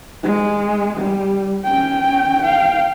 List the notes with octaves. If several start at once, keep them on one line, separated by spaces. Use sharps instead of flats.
G#3
G3
C#4 G5
F5 G5